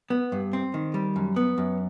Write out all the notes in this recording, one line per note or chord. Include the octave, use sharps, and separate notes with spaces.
B3
G2
C4
D#3
G3
F#2
B3
F#2